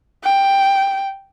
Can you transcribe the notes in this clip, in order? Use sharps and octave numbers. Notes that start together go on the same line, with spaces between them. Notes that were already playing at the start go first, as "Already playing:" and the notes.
G5